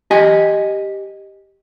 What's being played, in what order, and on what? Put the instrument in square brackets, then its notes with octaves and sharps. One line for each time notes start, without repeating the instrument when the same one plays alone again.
[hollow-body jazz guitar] G4 D#5 G#5